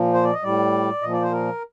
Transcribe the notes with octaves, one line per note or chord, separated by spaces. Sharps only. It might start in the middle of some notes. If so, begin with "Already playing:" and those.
Already playing: A#2 F3
C5
D5
D#5
A2 G3 D5
A#2 F3 D#5
D5
C5
A#4